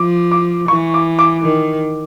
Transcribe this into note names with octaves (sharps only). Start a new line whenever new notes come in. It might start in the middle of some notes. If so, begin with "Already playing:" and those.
Already playing: F3 D6
D6
E3 C#6
D6
D6
D#3